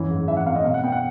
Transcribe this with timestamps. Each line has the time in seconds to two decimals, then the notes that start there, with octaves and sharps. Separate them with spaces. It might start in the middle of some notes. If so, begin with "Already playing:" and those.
Already playing: F#2 E3
0.10 G#2
0.28 E3 E5
0.37 F#5
0.46 C4 F5
0.56 D#5
0.65 B2 F5
0.74 F#5
0.83 B3 G5
0.92 F#5